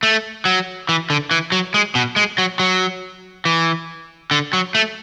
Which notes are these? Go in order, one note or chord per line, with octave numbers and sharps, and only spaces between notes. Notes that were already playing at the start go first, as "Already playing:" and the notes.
A3
F#3
E3
D3
E3
F#3
G#3
B2
G#3
F#3
F#3
E3
D3
F#3
A3